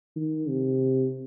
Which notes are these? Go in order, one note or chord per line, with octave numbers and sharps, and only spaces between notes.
D#3
C3